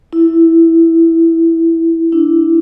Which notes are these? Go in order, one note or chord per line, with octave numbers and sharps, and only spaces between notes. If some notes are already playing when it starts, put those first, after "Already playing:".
E4
D4 E4